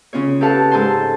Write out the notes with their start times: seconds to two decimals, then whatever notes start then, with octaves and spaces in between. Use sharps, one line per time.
0.13 C#3 C#4 F4 C#5
0.41 G4 A4 B4 F5 F#5 A5
0.71 G#2 A4 C5 G#5 A5 C6